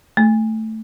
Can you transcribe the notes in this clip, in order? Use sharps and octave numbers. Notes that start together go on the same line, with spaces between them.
A3